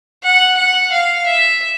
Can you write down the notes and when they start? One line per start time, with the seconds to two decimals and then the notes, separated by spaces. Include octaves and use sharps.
0.24 F#5
0.57 F#5
0.92 F5
1.26 E5